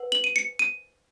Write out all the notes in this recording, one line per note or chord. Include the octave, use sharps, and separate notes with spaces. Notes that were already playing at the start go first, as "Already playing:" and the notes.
Already playing: B4 F#5
F#7
D#7
C#7
D#7